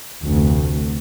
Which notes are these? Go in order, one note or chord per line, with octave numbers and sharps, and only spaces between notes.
F1 D2